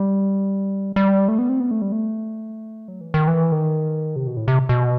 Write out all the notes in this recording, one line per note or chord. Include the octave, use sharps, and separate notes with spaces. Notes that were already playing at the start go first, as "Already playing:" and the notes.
Already playing: G3
G3
A3
B3
C4
B3
A3
G3
A3
F#3
E3
D#3
E3
D#3
C3
B2
A2
C3
B2